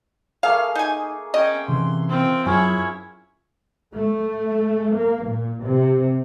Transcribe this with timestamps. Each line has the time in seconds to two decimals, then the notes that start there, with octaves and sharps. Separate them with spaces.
0.43 A3 A#3 G#4 F5
0.75 D#4 G#5
1.34 C#4 D#5 G5
1.68 C3 E3 C#4 C6
2.09 C4 F4
2.46 F#2 F#3 C#4 E4 F4 G#4 C#5
3.93 A3
4.94 A#3
5.24 A#2
5.64 C3